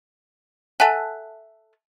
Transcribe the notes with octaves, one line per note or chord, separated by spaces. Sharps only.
A4 E5 F#5 G#5 A5 F#6